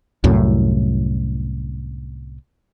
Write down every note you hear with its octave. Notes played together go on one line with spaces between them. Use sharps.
C2 F#2 A2